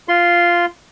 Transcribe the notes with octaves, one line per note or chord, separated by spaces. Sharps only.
F4 C6